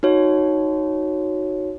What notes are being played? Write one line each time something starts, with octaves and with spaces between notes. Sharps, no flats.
D#4 F#4 C#5